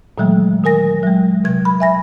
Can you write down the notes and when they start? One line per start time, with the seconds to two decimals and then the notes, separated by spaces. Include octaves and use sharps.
0.18 A#2 D#3 E3 F#3 G#3 A3
0.64 D#3 A#4 G#5 A#6
1.03 F#3 G#3
1.45 C3 F#3 G#6
1.65 B5
1.80 E5 G#5 A#6